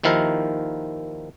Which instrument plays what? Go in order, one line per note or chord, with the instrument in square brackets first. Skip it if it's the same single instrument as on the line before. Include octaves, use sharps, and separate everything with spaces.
[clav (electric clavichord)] D#2 D#3 F3 E4 A#4 F5